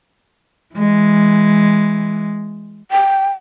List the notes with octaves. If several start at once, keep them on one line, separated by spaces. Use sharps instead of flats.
E3 G#3
G5